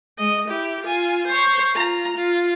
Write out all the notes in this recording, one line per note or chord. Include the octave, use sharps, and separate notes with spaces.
G#3 D#5
E4 G4
F4 G#5
C5 C#5
F4 A#5
F4